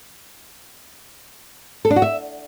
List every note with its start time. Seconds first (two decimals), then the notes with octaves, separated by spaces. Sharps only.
1.85 A4
1.90 D4
1.96 F#4
2.02 E5